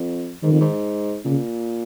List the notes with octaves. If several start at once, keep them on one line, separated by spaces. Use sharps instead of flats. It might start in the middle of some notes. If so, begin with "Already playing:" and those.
Already playing: F2
G#2 D#3
F2
G#2
A#2 C#3